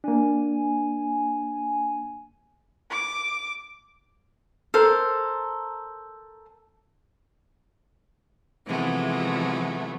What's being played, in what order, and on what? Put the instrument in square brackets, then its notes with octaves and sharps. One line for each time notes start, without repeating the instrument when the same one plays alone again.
[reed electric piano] A#3 D4 [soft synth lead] G#5
[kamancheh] D6
[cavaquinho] A4 A#4 C5
[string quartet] C3 E3 F3 G#3 A3 B3